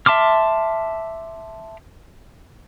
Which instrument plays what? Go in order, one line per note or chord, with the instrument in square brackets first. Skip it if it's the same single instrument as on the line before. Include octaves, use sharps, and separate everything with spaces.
[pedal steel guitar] E5 A5 C6 D6 F6